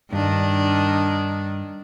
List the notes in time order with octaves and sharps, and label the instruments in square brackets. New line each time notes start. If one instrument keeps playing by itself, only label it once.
[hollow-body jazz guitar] G2 [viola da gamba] D#3 D4